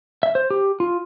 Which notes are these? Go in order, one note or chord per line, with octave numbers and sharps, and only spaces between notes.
E5
C5
G4
F4